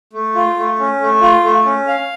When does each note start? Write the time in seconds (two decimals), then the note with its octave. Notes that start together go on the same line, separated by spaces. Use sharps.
0.13 A3
0.35 F4
0.57 A3
0.79 C#4
1.01 A3
1.21 F4
1.43 A3
1.65 C#4
1.87 F5